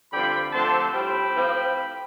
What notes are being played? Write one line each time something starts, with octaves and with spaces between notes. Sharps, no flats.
G2 D3 F3 C4 G5 B5
D3 F3 A3 C4 A5 C6
A2 G3 C4 G5 B5
A2 F3 C4